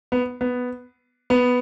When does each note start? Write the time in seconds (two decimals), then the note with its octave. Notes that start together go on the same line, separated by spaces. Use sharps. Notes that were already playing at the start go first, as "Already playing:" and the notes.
0.12 B3
0.41 B3
1.30 B3